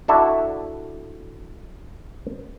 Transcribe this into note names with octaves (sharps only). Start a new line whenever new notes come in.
D4 E4 F#4 A4 E5